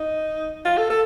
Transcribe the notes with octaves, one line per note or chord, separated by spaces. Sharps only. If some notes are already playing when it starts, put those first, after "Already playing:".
Already playing: D#4
F4
A4
A4